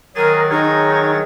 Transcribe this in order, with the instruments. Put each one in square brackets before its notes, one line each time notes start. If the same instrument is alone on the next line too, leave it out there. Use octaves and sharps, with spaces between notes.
[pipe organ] D#3 F#3 A6 [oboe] G#4 [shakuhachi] A#4
[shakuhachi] D#4 [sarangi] G#4 [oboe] C#5